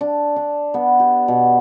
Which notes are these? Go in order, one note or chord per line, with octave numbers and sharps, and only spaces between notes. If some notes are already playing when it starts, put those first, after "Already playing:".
D4
D4
B3
G4
B2